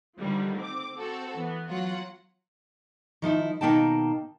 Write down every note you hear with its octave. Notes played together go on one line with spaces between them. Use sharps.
D3 D#3 F3 G3
C4 D6
C4 F#4 A4
E3 B3
F#3 F4 F#5
D#3 F3 D#4 E4
B2 D#3 A#3 D#4 G5 A5